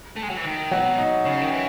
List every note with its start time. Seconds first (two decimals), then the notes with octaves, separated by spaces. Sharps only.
0.16 A3
0.23 G#3
0.30 F#3
0.37 E3
0.45 D#3
0.71 B2 F#3 F#4
0.98 D#4
1.25 C#3 C#4
1.42 D#3
1.51 E3